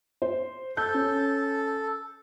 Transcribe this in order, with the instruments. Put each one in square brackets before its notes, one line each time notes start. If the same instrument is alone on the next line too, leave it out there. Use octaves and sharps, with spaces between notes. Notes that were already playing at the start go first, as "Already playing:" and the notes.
[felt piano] C5
[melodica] A4 [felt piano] G6
[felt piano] C#4